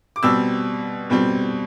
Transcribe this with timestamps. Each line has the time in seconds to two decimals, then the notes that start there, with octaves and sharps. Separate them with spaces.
0.16 D6
0.23 B2 G3 C4 E6
1.10 B2 G3 C4